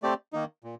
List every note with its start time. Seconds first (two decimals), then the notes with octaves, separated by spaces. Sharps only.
0.03 A3 C4 G4 D5
0.33 D#3 A#3 D#4
0.64 A#2